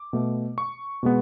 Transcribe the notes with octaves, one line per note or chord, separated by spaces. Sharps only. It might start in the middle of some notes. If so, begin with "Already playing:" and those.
Already playing: D6
B2 A3
C#6
B2 G#3 B3